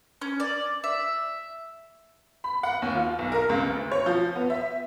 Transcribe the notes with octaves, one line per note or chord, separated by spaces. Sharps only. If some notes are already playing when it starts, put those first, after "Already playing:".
C#4
D5
E5
B5
F#5
D#2
F4
B1
A#4
C#2
D2
C#5
F3
B3
E5